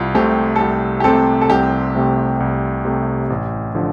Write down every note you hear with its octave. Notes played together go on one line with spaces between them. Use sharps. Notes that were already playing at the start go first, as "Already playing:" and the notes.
Already playing: C2 F4
C3 A3 C4 G4
A4
C2 G4
G4
C3 A3 C4 A4
A4
C2 G4
C3 A3 C4
C2
C3 A3 C4
A1
D3 F3